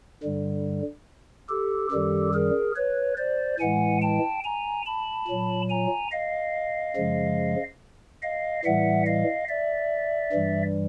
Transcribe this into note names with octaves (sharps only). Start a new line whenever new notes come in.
G2 D3 G3
G4 A4
F#2 D#3 G3 G4 A4
G#4 A#4
B4 C#5
C5 D5
A2 E3 G#3 F#5 G#5
G5 A5
G#5 A#5
A5 B5
A#2 F#3
G#5 A#5
D#5 F5
F#2 C#3 F3 G#3
D#5 F5
A2 E3 G3 E5 F#5
D#5 F5
D5 E5
G2 E3 G3